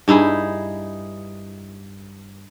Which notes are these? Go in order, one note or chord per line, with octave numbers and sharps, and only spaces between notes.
G2 D#4 E4 G#4